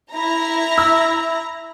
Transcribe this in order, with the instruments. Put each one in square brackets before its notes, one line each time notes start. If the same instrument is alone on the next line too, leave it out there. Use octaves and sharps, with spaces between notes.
[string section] E4 A#5
[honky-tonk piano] E6